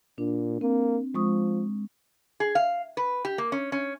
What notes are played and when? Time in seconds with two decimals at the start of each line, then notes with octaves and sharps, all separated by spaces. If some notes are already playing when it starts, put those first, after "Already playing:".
0.18 A#2 D4
0.61 A#3 C4
1.15 F3 G#3 C#6 D#6
2.40 G#4
2.55 F5
2.97 B4
3.25 G4
3.38 A#3
3.52 C#4
3.72 C#4